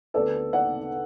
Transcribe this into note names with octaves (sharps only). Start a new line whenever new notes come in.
D2 D3 B3 A4 D5
D5 F#5